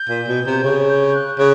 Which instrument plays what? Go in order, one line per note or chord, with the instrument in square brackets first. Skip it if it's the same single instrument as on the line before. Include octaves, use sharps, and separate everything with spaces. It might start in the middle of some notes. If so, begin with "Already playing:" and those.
Already playing: [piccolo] G6
[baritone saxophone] A#2
B2
C3
C#3
[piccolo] G6
F#6
[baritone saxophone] C#3 [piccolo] F#6